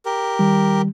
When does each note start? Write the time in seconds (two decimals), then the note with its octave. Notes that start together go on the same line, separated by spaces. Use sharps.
0.05 G4 A#4
0.39 D#3 G3